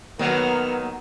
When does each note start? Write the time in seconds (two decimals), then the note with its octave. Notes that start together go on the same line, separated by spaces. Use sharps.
0.19 D#3 F#3 A#3 B3 F6